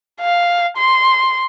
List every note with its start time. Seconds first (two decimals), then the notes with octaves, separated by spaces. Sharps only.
0.21 F5
0.77 C6